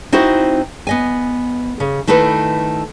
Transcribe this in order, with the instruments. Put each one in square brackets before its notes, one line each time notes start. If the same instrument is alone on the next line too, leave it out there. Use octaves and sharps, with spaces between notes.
[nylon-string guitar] C4 D#4 E4 F#4 C5
B3 D#5 G#5
C#3
D#3 A3 E4 A4 B4